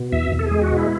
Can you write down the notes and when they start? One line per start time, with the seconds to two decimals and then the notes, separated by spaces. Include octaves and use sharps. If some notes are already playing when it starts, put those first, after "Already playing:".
Already playing: B2
0.12 E2 E5
0.32 E2
0.39 A4
0.46 G#4
0.51 G#3
0.62 F#4
0.72 B2 E4